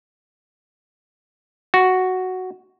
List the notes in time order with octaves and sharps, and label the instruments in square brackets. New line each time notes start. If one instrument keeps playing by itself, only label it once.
[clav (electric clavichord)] F#4